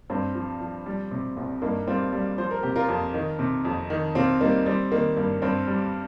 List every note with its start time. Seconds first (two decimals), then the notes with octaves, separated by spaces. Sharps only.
0.10 G2 C4
0.35 F3
0.60 F3
0.86 G3
1.11 C3
1.37 C2
1.62 G2 A#3 D#4
1.87 G3 C4 F4
2.13 G3
2.38 F3 C5
2.51 A#4
2.63 C3 G4
2.76 F4 A#4
2.89 F2
3.14 D#3
3.39 C3
3.65 F2
3.90 D#3
4.15 C3 C4 F4
4.41 G3 A#3 D#4
4.66 G3 C4
4.92 D#3 A#3
5.17 G2 A#3
5.42 G2 C4
5.67 G3